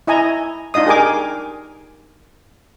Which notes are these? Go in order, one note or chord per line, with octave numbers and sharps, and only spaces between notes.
E4 D#5 G#5 A#5
D4 D#4 F4 D#5 D#6
G4 G#4 A#4 G#5 D6